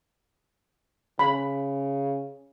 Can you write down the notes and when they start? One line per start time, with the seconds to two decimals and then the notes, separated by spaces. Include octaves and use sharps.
1.19 C#3 B5